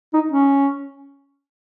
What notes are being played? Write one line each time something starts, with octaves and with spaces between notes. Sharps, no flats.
D#4
C#4